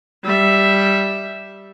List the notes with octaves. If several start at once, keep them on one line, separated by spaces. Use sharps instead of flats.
G3 E5